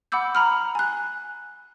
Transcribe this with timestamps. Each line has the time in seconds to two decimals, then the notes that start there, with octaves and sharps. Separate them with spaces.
0.12 F#5 B5 D6 E6 G6
0.35 A#5 B5 F6
0.75 G#5 F#6